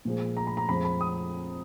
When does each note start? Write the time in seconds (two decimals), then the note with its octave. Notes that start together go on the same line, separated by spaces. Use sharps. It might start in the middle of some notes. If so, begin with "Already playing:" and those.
0.05 A#2 F3 G#3
0.37 A#5
0.47 B5
0.57 A#5
0.69 F2 F3 G#3 B5
0.85 B5
1.01 D#6